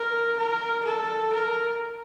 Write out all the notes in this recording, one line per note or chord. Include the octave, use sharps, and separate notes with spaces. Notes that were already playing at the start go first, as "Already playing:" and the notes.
Already playing: A#4
A#4
A4
A#4